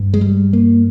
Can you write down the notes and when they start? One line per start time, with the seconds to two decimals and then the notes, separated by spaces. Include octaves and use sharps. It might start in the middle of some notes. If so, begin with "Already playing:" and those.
Already playing: G2
0.14 G#3
0.21 G3
0.53 A#3